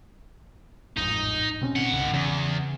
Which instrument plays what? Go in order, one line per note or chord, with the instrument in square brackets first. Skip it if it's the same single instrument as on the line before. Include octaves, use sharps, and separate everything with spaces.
[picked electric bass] A1 F2 G#2 [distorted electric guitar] D#4
[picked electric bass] B2 C4 C#4
[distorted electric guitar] D#3 F#5
[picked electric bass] G1 C2 C#3
[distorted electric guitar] E2 [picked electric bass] C#3